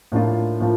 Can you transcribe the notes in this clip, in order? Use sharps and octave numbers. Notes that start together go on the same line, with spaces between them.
A2 F3 A#3 D4 F4
A2 F3 A#3